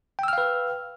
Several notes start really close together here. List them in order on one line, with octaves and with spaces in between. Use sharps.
G5 E6 F6 F5 B4